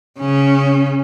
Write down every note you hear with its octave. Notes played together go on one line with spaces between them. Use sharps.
C#3 C#4